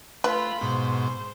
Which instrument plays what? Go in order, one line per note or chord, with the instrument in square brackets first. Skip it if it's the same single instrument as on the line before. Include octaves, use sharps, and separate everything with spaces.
[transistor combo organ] A3 [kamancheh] F4 B5 [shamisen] B4
[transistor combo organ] G#2 B2 [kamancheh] C5